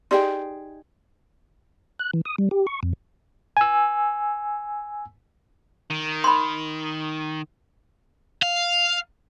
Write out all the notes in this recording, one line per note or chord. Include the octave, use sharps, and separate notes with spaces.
D#4 G4 G#4 D5 G5 C6
F#6
E3
D#6
G3
G4
C#6
F2
G#5 E6
D#3
B5 C6
F5